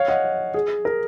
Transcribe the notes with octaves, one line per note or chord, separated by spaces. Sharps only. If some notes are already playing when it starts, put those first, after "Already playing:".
Already playing: C#5 F5
D#5 F#5
G#4
A#4